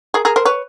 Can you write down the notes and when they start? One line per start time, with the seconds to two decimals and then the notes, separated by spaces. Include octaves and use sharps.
0.14 G#4 A#4
0.25 G#4 A#4
0.36 A#4 C5
0.45 B4 C#5